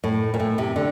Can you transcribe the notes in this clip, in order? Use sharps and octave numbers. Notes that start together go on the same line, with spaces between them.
A2
A#2
A2
C3
D3